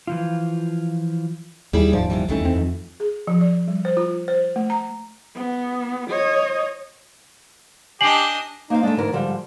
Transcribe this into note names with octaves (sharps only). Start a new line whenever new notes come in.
E3 F3 F4
D#2 G3 E4 G#4
D#1 G#2 F3 D5
C3 E3 G3
C2 D#3 E3 A3 C#4
E2 C4
F2
G#4
F3
D5
G3
C5
F4
C5
A3
A#5
B3
C#5 D#5
D4 G4 D#5 G#5 C7 F#7
A#3 D#4 C5 F5
G#3 A3 D4
D2 G#2 E3 A#4
G#2 D3 F3 G3